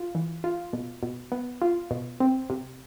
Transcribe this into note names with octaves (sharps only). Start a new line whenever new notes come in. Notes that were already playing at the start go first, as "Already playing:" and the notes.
Already playing: F4
E3
F4
B2
B2
B3
F4
B2
C4
C3